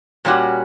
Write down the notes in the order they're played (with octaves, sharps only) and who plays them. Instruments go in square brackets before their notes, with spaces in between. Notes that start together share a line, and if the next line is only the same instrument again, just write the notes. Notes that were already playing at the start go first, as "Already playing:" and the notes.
[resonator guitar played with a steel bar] A#2 G3 C#4 F#4